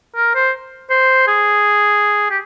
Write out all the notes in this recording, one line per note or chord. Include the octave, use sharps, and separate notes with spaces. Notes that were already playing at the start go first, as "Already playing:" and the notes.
A#4
C5
C5
G#4
G4